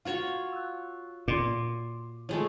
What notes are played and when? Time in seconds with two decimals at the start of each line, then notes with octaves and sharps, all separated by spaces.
0.05 F4 F#4 C#5 F5
0.53 E6 F#6
1.28 A#2 C6 D6
2.29 F3 G#3 A3 C#5